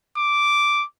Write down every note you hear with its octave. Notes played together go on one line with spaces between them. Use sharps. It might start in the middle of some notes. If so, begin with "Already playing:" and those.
D6